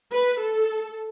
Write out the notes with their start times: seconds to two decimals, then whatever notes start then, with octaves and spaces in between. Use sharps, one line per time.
0.11 B4
0.39 A4